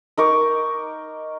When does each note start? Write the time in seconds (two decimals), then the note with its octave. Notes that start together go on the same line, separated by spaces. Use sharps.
0.17 D#4 A#4 C#6 D6